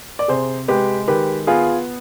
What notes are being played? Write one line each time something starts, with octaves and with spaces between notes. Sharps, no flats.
D5
C3 G#4 C5
G#3 G4 B4
D#3 G4 B4
B3 F4 G#4